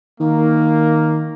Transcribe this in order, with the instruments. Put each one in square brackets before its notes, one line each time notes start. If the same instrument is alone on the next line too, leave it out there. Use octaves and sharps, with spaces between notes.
[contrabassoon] D#3 [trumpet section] A#3